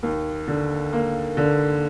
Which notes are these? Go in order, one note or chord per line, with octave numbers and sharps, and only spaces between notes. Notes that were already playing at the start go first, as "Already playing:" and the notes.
D#2
D3
A#3
D3